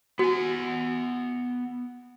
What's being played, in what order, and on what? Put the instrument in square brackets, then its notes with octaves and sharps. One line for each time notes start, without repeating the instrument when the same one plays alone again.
[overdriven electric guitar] B3 G#5 [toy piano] F#4